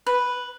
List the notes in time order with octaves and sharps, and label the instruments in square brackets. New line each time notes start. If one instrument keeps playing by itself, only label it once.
[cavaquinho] B4